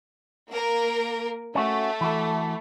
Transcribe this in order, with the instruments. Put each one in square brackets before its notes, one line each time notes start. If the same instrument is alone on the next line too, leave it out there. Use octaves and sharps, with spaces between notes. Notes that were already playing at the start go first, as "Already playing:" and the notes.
[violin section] A#3 A#4
[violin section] A3 [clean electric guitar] C#4 F#4
[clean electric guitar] E3 F#4 A4